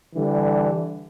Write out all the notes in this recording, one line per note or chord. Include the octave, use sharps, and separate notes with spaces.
D3 E3 G3